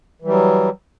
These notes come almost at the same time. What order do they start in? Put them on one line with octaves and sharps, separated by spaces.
E3 G3 F#3